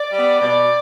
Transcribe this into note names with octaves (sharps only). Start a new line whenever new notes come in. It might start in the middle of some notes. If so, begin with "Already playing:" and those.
Already playing: D5
G3 B3
B2 D5